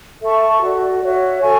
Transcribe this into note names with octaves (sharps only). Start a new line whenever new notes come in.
A4 E5 A5 C#6
F#4 A4 D5
F#4 C#5 E5
A4 C#5 G#5 C#6